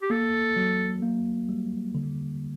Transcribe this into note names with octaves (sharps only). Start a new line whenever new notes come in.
G4
A#3 A4
F#3
A#3
G3
D3